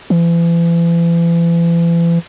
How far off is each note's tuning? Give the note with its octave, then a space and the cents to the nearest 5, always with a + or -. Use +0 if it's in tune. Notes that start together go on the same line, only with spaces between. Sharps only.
E3 +40